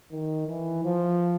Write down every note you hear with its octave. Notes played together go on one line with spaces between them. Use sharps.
D#3
E3
F3